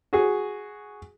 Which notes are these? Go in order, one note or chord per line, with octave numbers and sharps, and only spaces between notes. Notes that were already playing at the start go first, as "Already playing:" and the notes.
F#4 G#4